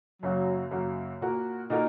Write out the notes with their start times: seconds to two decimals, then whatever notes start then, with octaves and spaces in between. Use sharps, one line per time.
0.22 F#2 C#3 F#3 A#3 F#4
0.71 F#2 C#3 A#3 F#4
1.21 A#2 A#3 F#4 A#4
1.70 A#2 A#3 D#4 F#4 A#4